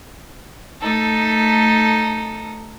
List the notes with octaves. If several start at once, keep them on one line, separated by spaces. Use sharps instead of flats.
A3 D#4 A4